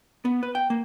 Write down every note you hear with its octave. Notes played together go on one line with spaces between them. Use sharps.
B3
B4
G5
A#3